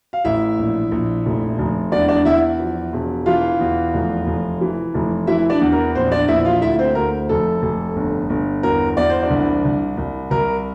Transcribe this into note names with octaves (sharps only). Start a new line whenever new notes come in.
F5
A1 E4 E5
A#1
A#1
F1
F1
E2 D4 D5
D4 D5
E2 E4 E5
F3
E1
E3 F4 F5
E2
F1
F1
E3
F1
E3 E4 E5
D4 D5
E2
A#4
A#1 C4 C5
D4 D5
A#1 E4 E5
F4 F5
D2 E4 E5
C4 C5
D2 A#4
F1 A4
F1
G1
G1
E2 A#4
E2 D5
C5
D4 D5
C2
C2
C2
C2 A#4